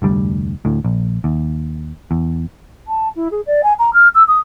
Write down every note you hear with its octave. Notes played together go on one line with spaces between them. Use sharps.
F1 D2 G3
D2 A2
A#1
D#2
E2
A5
E4
G#4
D5
G#5
A#5
F6
E6
D#6